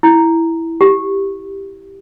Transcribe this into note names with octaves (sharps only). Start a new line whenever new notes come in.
E4
G4